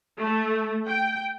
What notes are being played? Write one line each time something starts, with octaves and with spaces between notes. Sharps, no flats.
A3
G5